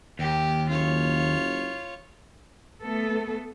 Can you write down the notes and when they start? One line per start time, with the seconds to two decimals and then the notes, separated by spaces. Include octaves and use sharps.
0.19 D#2 G4
0.69 F#1 F4 C#5
2.83 A3 B3 A4